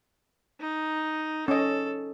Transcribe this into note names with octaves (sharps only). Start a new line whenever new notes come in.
D#4
C#4 A4 D#5